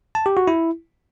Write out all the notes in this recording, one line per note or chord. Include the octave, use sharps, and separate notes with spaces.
A5
G4
F#4
E4